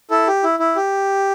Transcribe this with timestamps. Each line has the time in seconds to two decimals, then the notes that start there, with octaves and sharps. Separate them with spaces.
0.10 E4 A4
0.27 G4
0.44 E4
0.59 E4
0.76 G4